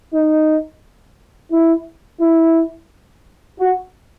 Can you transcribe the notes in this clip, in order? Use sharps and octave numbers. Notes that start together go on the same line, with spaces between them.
D#4
E4
E4
F#4